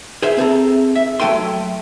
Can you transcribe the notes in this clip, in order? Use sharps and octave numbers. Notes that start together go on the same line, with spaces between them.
G#4 C5 E5
C4 G#4 A4 A#5
E5
F#3 A3 A4 G5 G#5 C6